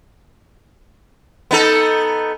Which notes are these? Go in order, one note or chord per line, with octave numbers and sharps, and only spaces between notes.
B3 D#4 A4